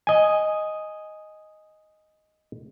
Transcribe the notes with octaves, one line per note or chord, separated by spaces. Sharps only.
D#5 G#5